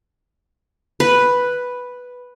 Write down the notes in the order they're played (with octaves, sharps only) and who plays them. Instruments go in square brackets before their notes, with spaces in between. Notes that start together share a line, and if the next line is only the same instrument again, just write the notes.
[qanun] B4